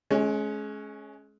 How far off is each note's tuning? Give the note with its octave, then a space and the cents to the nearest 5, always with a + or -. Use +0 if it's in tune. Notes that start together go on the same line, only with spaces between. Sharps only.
G#3 +30 C#4 -5